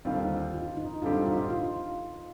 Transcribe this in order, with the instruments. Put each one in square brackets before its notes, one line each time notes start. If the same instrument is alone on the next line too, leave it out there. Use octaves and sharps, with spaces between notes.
[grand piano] D#2 D3 G3 C4 F4 [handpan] D#4
[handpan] F4
D#4
[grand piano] D2 D3 G3 C4 G4 [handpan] F4
[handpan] D#4
F4
F4
F4